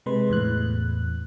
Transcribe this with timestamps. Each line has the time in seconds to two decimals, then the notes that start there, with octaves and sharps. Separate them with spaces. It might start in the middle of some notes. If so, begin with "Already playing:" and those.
0.06 C3 G#3 B4 C6
0.30 E2 A2 F#6